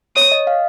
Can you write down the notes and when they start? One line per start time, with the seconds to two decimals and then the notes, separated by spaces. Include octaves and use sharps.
0.16 C#5 D#6
0.32 D#5
0.47 F5